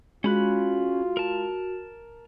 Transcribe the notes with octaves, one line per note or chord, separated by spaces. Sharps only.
G#3 C#4 F4 F#4 B5 F#6
A#4 A5